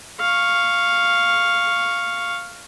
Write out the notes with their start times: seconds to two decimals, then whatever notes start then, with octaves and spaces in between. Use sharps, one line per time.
0.20 F5 C#6